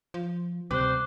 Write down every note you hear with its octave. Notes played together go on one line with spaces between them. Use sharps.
F3
D2 C3 G3 C4 C5 D6 F#6